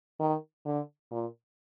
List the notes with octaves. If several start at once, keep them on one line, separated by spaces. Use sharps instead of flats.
D#3
D3
A#2